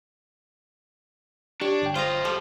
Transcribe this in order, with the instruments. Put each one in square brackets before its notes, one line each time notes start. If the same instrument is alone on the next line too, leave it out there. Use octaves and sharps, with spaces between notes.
[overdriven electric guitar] D4 [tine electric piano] G4 [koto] C#5
[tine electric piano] G1 G5
[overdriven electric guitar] F#2 C5 [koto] F4 D#5 A#5
[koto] F3 G3 A4